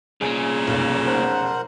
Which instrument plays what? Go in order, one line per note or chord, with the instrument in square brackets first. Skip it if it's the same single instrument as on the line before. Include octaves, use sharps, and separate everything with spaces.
[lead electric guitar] C2 A#2 [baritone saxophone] C#3 [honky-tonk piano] G#4
[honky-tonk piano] F1 B1
[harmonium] A#4 C5 F#5